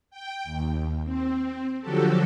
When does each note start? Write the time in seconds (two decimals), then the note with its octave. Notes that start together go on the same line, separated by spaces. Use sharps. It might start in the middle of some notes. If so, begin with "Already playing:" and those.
0.10 G5
0.44 D#2
1.04 C4
1.81 D3 F3 F#3 F#4 G4 A4